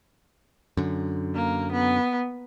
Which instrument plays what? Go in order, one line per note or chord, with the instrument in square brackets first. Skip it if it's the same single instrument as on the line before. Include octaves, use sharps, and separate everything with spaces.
[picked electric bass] F#2 D3
[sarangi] A#3
B3